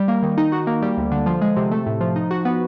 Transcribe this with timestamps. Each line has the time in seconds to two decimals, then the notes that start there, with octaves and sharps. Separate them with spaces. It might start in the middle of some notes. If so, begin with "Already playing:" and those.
Already playing: G3
0.08 A#3
0.23 D#3
0.38 D#4
0.52 F#4
0.67 A#3
0.82 G3
0.97 D2
1.12 D3
1.26 F3
1.41 G#3
1.56 C3
1.71 A3
1.86 A2
2.01 F3
2.16 D#4
2.31 F#4
2.45 B3